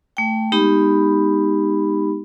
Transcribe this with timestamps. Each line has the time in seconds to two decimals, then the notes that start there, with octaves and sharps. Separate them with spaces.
0.17 A3 G5
0.52 G#3 B3 D#4 G4 B5